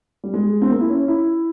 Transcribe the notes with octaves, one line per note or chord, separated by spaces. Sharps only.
G3
G#3
C4
A#3
E4
C#4
E4